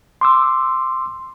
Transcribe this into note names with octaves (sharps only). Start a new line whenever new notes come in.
C6 D6 E6